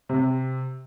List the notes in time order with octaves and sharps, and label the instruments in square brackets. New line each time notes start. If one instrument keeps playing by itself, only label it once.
[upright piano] C3